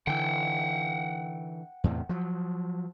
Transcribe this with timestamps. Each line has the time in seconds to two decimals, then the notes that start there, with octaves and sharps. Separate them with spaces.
0.07 D3 E3 F#5 G5
1.84 E2 A2 C3
2.09 F3 F#3